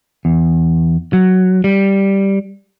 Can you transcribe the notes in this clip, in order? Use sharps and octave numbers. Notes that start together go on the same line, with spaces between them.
E2
F#3
G3